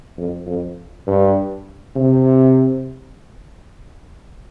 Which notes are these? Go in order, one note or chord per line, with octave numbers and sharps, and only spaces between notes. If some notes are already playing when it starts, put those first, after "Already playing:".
F2
F2
G2
C3